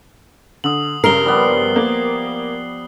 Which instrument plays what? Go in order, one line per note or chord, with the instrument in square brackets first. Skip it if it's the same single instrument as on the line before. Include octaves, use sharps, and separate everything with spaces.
[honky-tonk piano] D3 [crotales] D#6 F#7
[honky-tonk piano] G2 C#3 [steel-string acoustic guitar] A#4 [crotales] C7 G7
[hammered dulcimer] F3 G3 B3
[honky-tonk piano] A#3